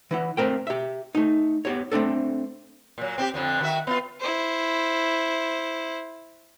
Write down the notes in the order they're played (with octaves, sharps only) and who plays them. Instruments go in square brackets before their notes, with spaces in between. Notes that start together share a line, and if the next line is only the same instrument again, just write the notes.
[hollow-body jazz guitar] E3 E4 F#5
A3 C4 A#4 G5
G4 E5
A3 D#4
B3 G4 C#5
A3 C4 D4 A4
[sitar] A#2 F#3
C4 D4 G4
F2 D3 F3
D#3 F#4 E5
B3 F4
[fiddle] E4 C5